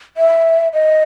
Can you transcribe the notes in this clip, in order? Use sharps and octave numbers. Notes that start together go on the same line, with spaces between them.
E5
D#5